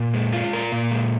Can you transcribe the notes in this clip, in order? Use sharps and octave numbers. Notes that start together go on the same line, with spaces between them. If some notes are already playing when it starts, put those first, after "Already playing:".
Already playing: A#2
G#3
F4
A#4
A#2
G#3